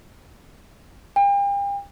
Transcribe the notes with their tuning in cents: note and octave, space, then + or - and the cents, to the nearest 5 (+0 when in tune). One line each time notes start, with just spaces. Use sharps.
G5 +40